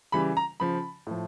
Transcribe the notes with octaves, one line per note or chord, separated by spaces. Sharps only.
C#3 E3 G3 B5
A#5
C#3 F3 B5
A2 F3